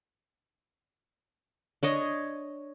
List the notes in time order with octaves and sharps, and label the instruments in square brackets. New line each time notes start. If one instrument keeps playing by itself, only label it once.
[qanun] D4 C#5 D#5